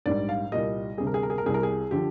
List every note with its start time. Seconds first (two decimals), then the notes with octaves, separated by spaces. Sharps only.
0.06 A#1 G#2 G3 D5
0.29 F5
0.52 C2 A#2 G3 D#5
0.98 D2 C3 G3 G#4
1.07 A#4
1.14 G#4
1.23 A#4
1.30 G#4
1.38 A#4
1.44 C2 C3 G3 G#4
1.54 A#4
1.63 G#4
1.91 D3 F3 G4